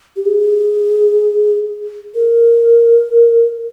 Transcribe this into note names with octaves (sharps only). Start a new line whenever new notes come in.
G4
G#4
A#4